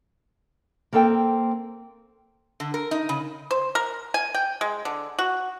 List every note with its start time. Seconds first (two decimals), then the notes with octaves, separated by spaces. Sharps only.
0.93 A#3 C4 A4 D5 G5
2.60 D3
2.74 A#4
2.91 D#4
3.09 C#3
3.51 C5
3.75 A#4
4.14 G#5
4.35 G5
4.61 G#3
4.85 D3
5.19 F#4